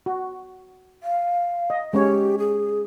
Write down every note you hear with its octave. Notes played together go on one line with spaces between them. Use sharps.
F#4
F5
D#5
G#3 C#4 G4 C#5
G#4